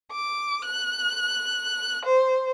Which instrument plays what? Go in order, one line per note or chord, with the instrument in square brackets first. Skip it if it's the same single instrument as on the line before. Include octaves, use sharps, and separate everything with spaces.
[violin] D6
F#6
C5